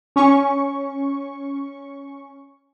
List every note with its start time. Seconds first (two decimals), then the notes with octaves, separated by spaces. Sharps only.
0.16 C#4 C#6